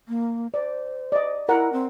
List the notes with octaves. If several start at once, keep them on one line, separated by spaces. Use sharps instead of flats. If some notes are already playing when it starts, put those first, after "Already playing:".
A#3
C5 D5
D5 D#5
E4 A#4 F#5 A#5
C4